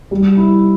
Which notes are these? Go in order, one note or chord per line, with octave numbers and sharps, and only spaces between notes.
G3
E4